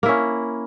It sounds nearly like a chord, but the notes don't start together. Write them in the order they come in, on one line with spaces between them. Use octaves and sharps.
A#3 E4 C#4